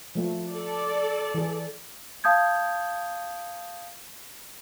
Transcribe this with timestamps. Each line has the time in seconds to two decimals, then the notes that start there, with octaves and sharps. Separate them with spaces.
0.15 F3 A3
0.53 A4 D5
1.34 E3 G#4
2.24 F5 A5 D#6 G6 G#6